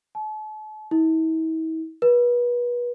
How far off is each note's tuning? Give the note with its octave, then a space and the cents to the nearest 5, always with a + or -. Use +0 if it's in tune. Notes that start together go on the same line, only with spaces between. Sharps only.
A5 -40
E4 -45
B4 -30